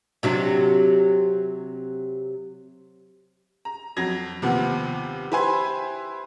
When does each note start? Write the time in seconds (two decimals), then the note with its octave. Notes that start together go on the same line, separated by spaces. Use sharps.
0.23 C3 F#3 D4
3.65 A#5
3.97 F2 F#3 G#6 A#6
4.42 D#2 C3 F3 B3
5.32 E4 G4 B4 C5 G#5 C6